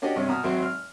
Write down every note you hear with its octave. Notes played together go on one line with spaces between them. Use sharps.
C#4 D4 F#4 G4 D#5
G2 C3 C#4 C#6
B2 A#5 D#6 F6
G#1 F#3 C4 E5
F6